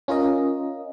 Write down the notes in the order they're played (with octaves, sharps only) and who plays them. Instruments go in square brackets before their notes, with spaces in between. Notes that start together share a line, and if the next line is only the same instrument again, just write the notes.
[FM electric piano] C#4 F4 A#4 D#5